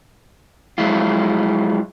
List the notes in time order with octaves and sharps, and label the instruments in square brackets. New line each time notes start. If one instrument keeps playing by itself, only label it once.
[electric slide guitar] F3 F#3 G#3 E4 F4